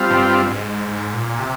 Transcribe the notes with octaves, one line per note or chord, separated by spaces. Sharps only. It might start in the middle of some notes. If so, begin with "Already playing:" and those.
Already playing: G3 C4 F4
G2
G#2
G#2
A#2
C3